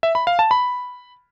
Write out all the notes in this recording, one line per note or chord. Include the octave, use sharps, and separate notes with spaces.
E5
B5
F5
A5
B5